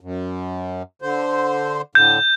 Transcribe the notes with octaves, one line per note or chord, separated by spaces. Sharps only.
F#2
D3 C5
A2 D3 G6